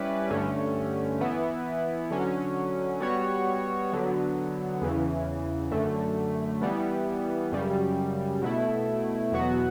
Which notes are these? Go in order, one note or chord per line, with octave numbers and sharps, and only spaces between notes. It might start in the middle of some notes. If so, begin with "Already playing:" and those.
Already playing: G3 C#4 E4 B4 D5
G2 D3 A3 C#4
E3 B3 E4
D3 F#3 C#4
G3 B3 F#4 C#5
D3 F#3 B3
E2 C#3 E3
F#2 D3 A3
E3 G3 B3
F#2 C#3 G3
B2 A3 E4
E2 B2 F#3 B3 F#4